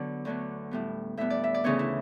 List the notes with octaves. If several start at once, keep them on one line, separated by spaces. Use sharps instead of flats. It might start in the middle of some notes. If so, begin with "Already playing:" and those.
Already playing: D3 F#3 B3 D5
D2 D3 F#3 B3
A2 G3 B3
A2 G3 B3 E5
D5
E5
D5
D2 C#3 E3 B3 C#5
E4